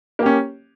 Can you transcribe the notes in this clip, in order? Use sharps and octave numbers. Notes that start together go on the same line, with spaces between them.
A#3 C#4 G4